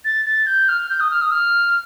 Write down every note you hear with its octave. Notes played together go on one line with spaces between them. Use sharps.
A6
A6
G6
F6
G6
D#6
F6
D#6
F6